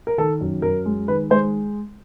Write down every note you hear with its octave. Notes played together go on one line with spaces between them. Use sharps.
A#4
D#3 A4
F#2
F#2 A#4
G#3
D#3 B4
G#3 C5